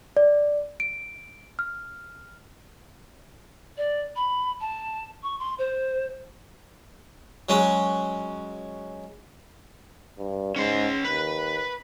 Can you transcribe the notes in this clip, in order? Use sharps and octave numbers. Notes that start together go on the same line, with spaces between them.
D5
D7
F6
D5
B5
A5
C#6
C6
C5
F#3 G#3 C#4
G2
G#2 C#4 C6
D#2 B4